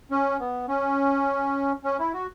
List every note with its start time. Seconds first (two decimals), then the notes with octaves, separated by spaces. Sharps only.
0.11 C#4
0.40 B3
0.68 C#4
1.84 C#4
1.99 E4
2.14 F#4